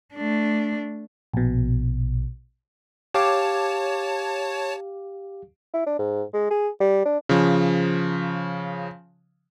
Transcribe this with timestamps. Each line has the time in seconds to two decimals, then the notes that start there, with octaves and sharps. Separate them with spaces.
0.15 A3 D4
1.34 A#1 B2
3.14 G4 C#5 F5 A5 D6
5.74 E4
5.86 D4
5.99 G#2
6.34 G#3
6.50 G#4
6.80 G3
7.05 D4
7.29 C#3 F3